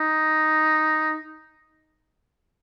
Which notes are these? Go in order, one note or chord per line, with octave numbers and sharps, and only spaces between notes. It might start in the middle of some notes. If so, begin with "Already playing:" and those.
Already playing: D#4